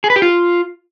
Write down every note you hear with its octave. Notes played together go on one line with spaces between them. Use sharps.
G#4
B4
G4
F4